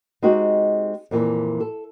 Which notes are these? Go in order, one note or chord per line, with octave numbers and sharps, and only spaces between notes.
G#3 C4 D#4 F#4 G4 D#5
F2 A#2 D3 E3
A4